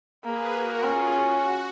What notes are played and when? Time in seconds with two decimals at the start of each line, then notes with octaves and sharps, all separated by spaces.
0.24 A#3 G#4 B4
0.53 F#4 A#4
0.83 C#4 F4 G#4
1.13 F#4